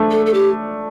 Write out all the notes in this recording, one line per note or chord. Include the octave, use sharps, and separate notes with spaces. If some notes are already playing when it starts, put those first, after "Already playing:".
Already playing: A3 D4
A4
A4
G4